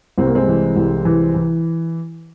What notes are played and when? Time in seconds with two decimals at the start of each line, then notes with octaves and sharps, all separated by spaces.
0.18 C2 C4
0.27 A#3
0.35 G#3 C4
0.48 E3
0.76 C2
1.05 E3
1.34 E3